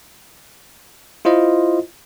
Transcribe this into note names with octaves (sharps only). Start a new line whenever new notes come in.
E4 F4 C5 D#5